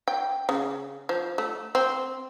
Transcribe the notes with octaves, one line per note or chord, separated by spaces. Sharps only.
G5
C#3
F3
A3
C4